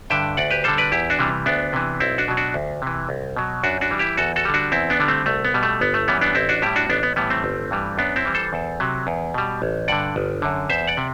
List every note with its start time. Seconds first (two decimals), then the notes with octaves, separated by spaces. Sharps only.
0.10 G2 D3 E5 G5
0.37 D2 D5 F#5
0.50 G4 B4
0.64 D3 G3 A4 C5
0.78 B4 D5
0.92 E2 E4 G4
1.10 D4 F#4
1.19 C3 E3 G3
1.46 D2 B3 D4
1.73 C3 E3
2.00 B1 C4 E4
2.18 D4 F#4
2.28 B2 F#3
2.37 D4 F#4
2.54 D2
2.82 C3 E3
3.09 C2
3.36 B2 F#3
3.63 F#2 D4 F#4
3.81 D4 F#4
3.91 E3 G3
3.99 E4 G4
4.17 E2 F#4 A4
4.36 F#4 A4
4.45 D3 G3
4.54 D4 F#4
4.72 E2 C4 E4
4.90 B3 D4
5.00 D3 G3
5.08 A3 C4
5.26 C2 A3
5.45 B3
5.54 B2 G3
5.63 A3
5.81 G1 B3
5.94 A3
6.08 F#2 E3 G3 B3
6.21 B3 D4
6.35 A1 C4 E4
6.49 D4 F#4
6.62 A2 G3 E4 G4
6.76 D4 F#4
6.89 A1 B3 D4
7.03 B3
7.16 A2 E3 G3 B3
7.30 A3 C4
7.44 G1
7.71 G2 E3 G3
7.98 F#2 B3 D4
8.16 C4 E4
8.25 E3 G3
8.35 A4 C5
8.53 E2
8.80 C3 F#3
9.07 E2
9.34 B2 G3
9.62 A1
9.88 G2 D3 D5 F#5
10.16 G1
10.42 F#2 D3
10.70 E2 C5 E5
10.87 D5 F#5
10.97 C3